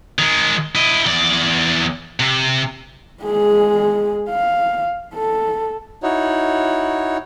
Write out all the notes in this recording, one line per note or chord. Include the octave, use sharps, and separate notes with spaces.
D#3 G#3
E4 D#5
E2 D5
C3
G#3 G#4
F5
A4
D#4 E4 F#4 C#5